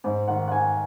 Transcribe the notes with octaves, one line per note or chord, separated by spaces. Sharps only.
G#2 C5
D#3 F#5
F#5
D#3 G#5